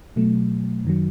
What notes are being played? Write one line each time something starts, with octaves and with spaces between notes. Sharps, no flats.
B2 F#3 A3
F#2 D#3 F#3